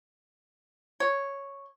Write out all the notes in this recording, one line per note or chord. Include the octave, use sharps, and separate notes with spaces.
C#5